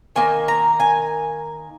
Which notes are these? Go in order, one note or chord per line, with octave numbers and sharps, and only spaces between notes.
D#3 A#3 D#4 G#5
A#5
G#5